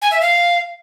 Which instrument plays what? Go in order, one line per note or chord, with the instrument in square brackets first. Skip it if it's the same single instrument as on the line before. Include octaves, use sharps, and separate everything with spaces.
[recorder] G#5
E5
F5